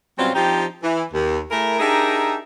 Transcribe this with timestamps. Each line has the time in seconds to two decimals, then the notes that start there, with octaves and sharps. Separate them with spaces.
0.18 B2 F#3 G3 C4 C#4 F4
0.35 F3 C4 D4 D#4 G4
0.83 E3
1.12 D#2
1.51 A3 E4 G#4 A#4
1.80 D4 D#4 G4 G#4 A#4 E5